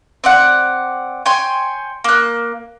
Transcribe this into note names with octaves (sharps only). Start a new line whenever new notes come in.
C4 D5 F#5
C#5 G5 G#5 C6
A#3 F#6